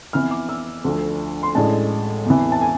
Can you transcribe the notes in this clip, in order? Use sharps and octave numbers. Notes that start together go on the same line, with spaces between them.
F2 E3 B3 F6
D6
E6
D2 D3 F3 A3
C6
A1 A2 G#3 D4 A5
E2 C3 E3
A5
G#5